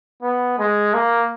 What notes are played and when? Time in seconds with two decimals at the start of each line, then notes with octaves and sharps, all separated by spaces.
0.23 B3
0.59 G#3
0.94 A#3